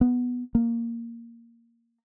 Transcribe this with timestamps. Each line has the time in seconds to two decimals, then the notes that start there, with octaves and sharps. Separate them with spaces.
0.01 B3
0.55 A#3